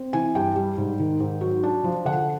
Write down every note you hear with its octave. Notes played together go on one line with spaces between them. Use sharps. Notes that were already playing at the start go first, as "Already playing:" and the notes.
Already playing: C4
E3 G#5
G2 G5
G3
G#2
D#3
G#2
F#3
D4
F3
D3 F#5